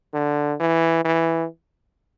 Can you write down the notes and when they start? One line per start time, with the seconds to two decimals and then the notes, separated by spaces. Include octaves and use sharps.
0.14 D3
0.60 E3
1.05 E3